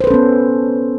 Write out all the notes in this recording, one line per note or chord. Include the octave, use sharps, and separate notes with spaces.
B3 C#4 A4 B4 C5